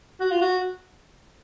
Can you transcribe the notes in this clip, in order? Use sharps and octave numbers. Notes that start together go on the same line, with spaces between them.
F#4
F4
F#4